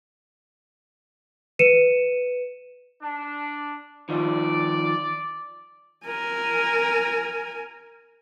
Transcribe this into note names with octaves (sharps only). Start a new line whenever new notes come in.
B4 C#7 D#7 E7
D4
D#3 F3 F4 D5
A#4 G#5